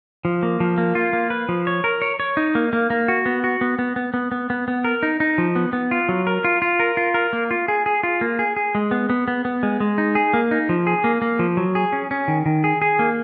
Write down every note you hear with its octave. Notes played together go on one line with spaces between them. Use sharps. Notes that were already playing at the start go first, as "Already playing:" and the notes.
F3
A#3
F3
A#3
F4
A#3
B4
F3
C#5
A#4
C#5
C#5
D#4
A#3
A#3
A#3
F#4
B3
F#4
B3
B3
B3
B3
B3
B3
B3
A#4
D#4
D#4
F3
B3
B3
F4
F#3
A#4
F4
F4
A#4
F4
A#4
A#3
F4
G#4
G#4
F4
A#3
G#4
G#4
G#3
B3
B3
B3
B3
G#3
G#3
D#4
G#4
A#3
D#4
F3
G#4
A#3
A#3
F3
F#3
G#4
C#4
C#4
D#3
D#3
G#4
G#4
A#3